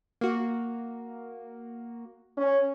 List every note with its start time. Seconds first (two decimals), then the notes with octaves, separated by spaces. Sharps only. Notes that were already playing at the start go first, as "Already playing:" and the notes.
0.21 A#3 F#4
2.37 C#4